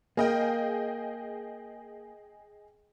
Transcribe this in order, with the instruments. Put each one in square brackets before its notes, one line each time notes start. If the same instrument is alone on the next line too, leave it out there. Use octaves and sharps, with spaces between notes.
[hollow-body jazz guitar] A#3 [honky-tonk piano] G#4 D#5 G5